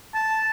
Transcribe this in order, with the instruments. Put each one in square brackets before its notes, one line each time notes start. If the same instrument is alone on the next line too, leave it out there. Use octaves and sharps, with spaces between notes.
[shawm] A5